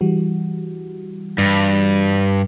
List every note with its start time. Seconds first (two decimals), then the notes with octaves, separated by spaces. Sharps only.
0.01 E3 G3 F#4
1.38 G2